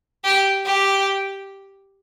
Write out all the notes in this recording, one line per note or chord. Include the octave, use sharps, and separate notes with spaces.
G4
G4